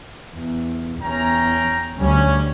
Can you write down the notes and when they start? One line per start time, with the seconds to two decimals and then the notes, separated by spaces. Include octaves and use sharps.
0.33 E2
1.01 E2 C#4 G5 A#5
1.98 D2 G3 C#4